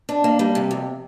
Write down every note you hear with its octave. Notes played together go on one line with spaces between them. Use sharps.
D4
A#3
G3
C3
F2